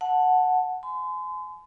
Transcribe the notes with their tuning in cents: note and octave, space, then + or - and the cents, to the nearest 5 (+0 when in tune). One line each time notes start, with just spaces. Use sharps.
F#5 -10 A5 +0
G#5 +35 C6 -40